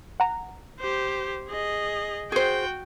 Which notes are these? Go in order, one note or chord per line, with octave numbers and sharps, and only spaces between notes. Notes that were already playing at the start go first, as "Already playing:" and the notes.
F#5 A#5
G4 C5
G#4 D#5
F#4 G#4 C5 G5